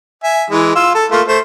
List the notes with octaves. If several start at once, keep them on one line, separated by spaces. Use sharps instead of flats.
E5 G#5
E3 G#3
F4 E6
A4
A3 A#3 F4
A3 C5